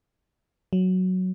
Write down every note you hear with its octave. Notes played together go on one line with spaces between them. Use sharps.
F#3